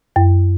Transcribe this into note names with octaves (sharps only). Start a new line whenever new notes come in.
F#2